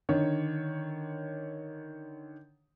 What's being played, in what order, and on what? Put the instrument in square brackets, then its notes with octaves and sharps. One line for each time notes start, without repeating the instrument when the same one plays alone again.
[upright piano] D3 D#3 C#5